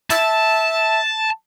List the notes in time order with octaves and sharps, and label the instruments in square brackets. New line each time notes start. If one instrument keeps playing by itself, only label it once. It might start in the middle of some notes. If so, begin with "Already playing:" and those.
[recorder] E5 [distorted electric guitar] A5